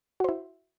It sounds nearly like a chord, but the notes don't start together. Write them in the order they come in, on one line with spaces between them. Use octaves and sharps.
F#4 C5 E4